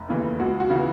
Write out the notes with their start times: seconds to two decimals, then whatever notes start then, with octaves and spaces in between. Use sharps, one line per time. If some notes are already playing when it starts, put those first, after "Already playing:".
Already playing: F1
0.08 D#2 C#3 E3
0.40 C#2 F#4
0.60 F#4
0.70 C#3 E3